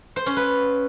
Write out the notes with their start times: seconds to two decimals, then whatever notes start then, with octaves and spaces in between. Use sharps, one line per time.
0.16 C5
0.26 C#4
0.37 B4